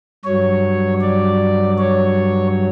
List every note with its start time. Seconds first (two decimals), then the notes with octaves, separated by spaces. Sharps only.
0.24 G2 F#3 C#5
1.02 D5
1.78 C#5